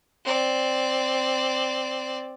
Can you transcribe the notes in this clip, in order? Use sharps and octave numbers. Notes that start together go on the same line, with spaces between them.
C4 D5